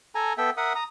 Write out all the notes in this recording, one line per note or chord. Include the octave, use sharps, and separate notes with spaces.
A4 G#5 A#5
B3 A4 E5 G5
A#4 E5 F#5 D#6
A#5 D#6